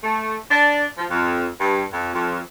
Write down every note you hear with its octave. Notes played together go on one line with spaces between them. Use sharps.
A3
D4
F3
F2
G2
F2
F2